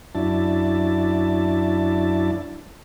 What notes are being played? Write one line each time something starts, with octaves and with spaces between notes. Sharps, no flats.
F#2 D4 E4 A5